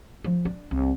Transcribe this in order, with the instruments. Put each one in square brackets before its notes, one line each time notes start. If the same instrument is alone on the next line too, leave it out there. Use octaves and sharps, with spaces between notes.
[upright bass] F3
D4
C2